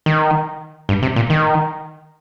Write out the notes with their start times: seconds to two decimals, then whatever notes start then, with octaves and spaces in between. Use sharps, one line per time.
0.06 D#3
0.89 G2
1.02 C3
1.16 A#2
1.30 D#3